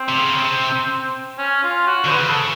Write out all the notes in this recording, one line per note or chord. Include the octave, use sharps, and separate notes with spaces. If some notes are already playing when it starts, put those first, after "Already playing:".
Already playing: C4
C3
C#3
C3
C#4
F4
F#4
D3 C5
C#3 B4
A4